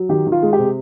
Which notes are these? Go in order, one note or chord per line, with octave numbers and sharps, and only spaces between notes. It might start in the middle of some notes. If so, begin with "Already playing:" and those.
Already playing: F#3
D#3 G4
D#3
F4
G#3
G4
C3